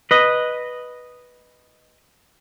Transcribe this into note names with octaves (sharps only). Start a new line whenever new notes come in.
B4 D#5